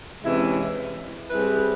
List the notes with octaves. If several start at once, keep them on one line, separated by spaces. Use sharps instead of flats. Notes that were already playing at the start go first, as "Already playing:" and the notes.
C3 E3 G#3 C#4 E4
G3 C4 E4 G#4 B4